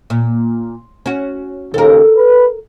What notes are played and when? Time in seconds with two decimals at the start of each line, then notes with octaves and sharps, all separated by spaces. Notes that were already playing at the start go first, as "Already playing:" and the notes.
0.10 A#2
1.06 C#4 F#4
1.74 D#2 C#3 A4 A#4
2.16 B4